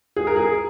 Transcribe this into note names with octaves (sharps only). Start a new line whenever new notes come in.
G#4
A#4
G#4